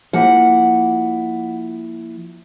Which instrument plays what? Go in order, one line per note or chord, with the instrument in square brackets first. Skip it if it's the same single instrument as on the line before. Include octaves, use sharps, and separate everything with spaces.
[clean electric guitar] F3 A#3 E4 [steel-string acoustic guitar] F#5